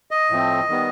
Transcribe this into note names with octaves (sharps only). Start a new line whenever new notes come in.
D#5
A2 F3 A3 C4
D#3 G3 B3